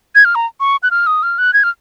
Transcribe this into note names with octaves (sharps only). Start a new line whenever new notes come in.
G#6
F6
A#5
C#6
F#6
F6
D#6
F6
F#6
G#6
F6